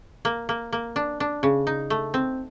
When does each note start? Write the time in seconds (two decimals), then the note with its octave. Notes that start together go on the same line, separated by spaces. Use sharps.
0.25 A#3
0.49 A#3
0.73 A#3
0.96 D4
1.20 D4
1.43 C#3
1.67 D#4
1.90 A3
2.14 C4